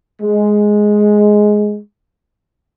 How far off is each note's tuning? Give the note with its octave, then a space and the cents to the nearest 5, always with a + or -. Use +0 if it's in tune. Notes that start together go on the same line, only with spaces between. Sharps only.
G#3 +5